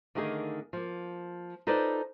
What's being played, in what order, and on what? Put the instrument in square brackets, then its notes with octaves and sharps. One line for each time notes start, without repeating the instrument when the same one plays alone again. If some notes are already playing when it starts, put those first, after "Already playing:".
[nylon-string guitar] D3 D#3 A3 A#3 D#4 G#4
F3 A#3
D#4 F4 A4 B4 C5 D5